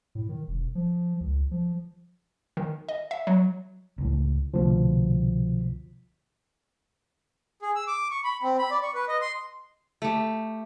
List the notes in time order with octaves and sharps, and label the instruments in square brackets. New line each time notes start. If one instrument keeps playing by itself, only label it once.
[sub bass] A2
D#3
E1
F3
C#2
F3
[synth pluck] D#3
D#5
E5
F#3
[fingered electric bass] C#2 A2
[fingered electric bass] C2 D3 A3 [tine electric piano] B2 F3
[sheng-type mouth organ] G#4
E6
D6
C#6
B5
C4
B5
D5
C#6
B4
D#5
C6
[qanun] A3 G4